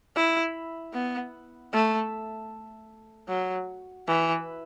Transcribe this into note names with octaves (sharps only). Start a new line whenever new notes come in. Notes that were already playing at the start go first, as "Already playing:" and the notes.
E4
B3
A3
F#3
E3